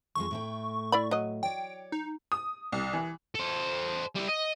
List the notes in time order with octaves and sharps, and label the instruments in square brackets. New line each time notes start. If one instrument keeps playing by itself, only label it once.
[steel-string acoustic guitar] F2 F3 G#3 [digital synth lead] C#6
[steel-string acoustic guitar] A2 A3 G5
[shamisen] E4 D5 B5
F#3 D#5
[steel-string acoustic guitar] C#5 D5 [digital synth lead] G5
[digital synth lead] D#4
[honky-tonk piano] D#6
C2
E3
[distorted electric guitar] A4 C5
G3 E4
D#5